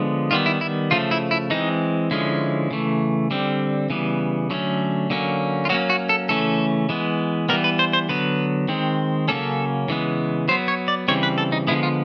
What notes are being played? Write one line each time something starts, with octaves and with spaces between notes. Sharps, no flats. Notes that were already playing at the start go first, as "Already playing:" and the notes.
Already playing: D3 F3 G#3 B3
D#3 G3 B3 F4
E4
E4
C#3 F3 A3 F4
E4
E4
E3 G#3 C4 D#4
D3 F3 G#3 C#4 E4
C#3 E3 A3
D3 G3 C4
C#3 E3 G3 B3
D3 F#3 A3 C#4
D3 F#3 A#3 C#4
F4
F#3 A#3 C#4 F#4
F#4
A4
C#3 E3 A3 C#4 A4
E3 G#3 B3
E3 G3 B3 A#4
B4
C5
C5
D3 F#3 B3 B4
D#3 G#3 C4
C#3 F#3 A#3 C#4 A4
C#3 E3 G#3 B3
F#3 B3 C5
C#5
D5
C#3 E3 G3 C4 C#5
B4
A4
D#4
D3 F3 G#3 B3 E4
F4